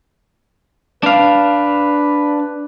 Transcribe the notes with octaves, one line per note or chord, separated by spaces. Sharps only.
D4 B4 F5